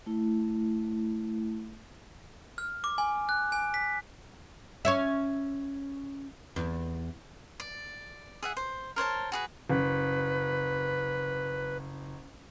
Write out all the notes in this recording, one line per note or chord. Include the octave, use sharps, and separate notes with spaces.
A3 E4
F6
D6
G#5
F#6
G#5
B6
C#4 C#5 E5
E2
D5
G#4 E5 F#5
C5
A#4 C5 C#5 A5
F#4 G#4 B4
F#1 B4